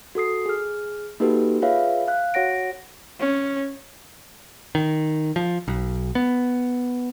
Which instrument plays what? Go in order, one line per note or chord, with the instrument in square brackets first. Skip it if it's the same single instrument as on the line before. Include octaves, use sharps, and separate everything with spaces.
[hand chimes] F#4 A4 D#6 C7
G#4 F6
A#3 D#4 F#4 G4 A4 B4
F4 G#4 B4 C#5 E5 F5
F5 F#6
F#4 C#5 F#5 A#6 D7
[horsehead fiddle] C#4
[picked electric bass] D#3
F3
B1
B3